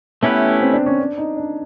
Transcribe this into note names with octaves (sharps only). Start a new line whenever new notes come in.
A3 B3 C#4 E4 G4 B4
C4
D4
C#4
D4
D#4
D4